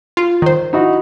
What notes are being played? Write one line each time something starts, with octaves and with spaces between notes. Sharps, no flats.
F4
D#3 C5
D#4 E4 F#4